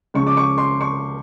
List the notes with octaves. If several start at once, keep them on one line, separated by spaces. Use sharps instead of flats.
C#2 C#3 F3 C#6
D6
C#6
C6
C#6